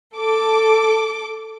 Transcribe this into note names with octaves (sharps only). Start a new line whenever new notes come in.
A4 D6